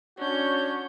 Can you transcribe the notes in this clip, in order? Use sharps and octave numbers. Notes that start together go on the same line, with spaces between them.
C#4 D4 F#4 C#5 G6